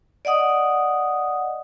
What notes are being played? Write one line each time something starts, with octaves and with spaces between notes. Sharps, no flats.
D5 D#5 F#5 D#6